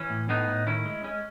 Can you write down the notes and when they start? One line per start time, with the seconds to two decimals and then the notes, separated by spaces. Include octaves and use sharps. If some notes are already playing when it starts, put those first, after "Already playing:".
Already playing: E3 C#4
0.10 A2
0.29 A2 B3 D#4
0.48 A2
0.67 D#3 C#4 E4
0.86 G#3
1.04 G#3 C#4